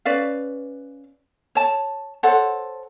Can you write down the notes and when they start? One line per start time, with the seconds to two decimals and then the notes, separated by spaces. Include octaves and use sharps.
0.05 C#4 B4 D5 F5
1.55 C#5 A5
2.23 A4 C5 C#5 F#5